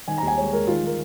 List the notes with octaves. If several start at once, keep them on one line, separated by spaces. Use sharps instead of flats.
D#3 G#5
A#5
D#2
G#5
G#3 C#5
G#3 A#4
D#3 F4
D#3 A#4